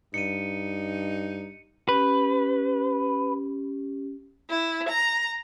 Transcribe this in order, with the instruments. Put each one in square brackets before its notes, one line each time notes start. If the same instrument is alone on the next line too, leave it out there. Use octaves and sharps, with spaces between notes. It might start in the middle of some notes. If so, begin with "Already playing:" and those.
[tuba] G2 [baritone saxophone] D#4 [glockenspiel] C#7 D#7
[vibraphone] C#4 G4 [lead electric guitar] B4
[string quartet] E4
A#5